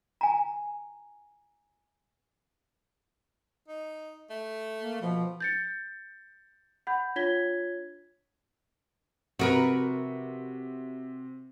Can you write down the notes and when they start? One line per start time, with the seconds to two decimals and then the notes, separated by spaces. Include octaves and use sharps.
0.21 G#5 A#5
3.68 D#4
4.30 A3
4.81 A#3
5.02 B2 F3
5.40 G6 A6 C#7
6.87 F#5 B5 G6
7.16 D4 F4 C#5 G#6 B6 G7
9.39 C3 F#4 A#4 B4